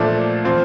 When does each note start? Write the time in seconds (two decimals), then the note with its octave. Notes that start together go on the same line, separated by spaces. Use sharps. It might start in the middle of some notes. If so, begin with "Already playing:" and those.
Already playing: A#2 F3 A3 D4
0.44 F3 C4 F4